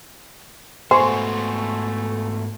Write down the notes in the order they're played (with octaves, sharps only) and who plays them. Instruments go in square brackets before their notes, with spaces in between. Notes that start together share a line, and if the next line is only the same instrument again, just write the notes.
[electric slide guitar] G#2 B3 F#4 [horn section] A3 [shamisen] C5 [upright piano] G#5 C6 C#6